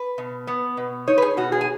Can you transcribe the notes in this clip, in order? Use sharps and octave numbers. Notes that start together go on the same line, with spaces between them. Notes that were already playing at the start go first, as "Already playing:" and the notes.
Already playing: B4
B2
B3
B2
D#4 C#5
B4
G#4
B2 F#4
G#4
G#5